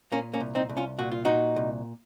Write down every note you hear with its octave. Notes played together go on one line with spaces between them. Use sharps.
A#2 A#3 C#4
A#3 C#4
C2
C4 D#4
C2
C#4 F4
A#2 F#4
F4
A#2 D#4 F#4
C2